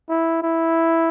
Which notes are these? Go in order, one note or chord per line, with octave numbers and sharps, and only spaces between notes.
E4
E4